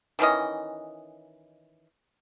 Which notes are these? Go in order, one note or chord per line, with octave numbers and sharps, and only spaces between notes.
D#3 E3 C#4 D#5